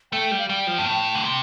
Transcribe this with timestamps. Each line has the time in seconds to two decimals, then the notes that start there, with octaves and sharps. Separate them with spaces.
0.12 A3 G5
0.31 G3
0.39 F5
0.48 G3 G5
0.67 F3
0.78 G2
0.86 A2
1.15 D3
1.22 C3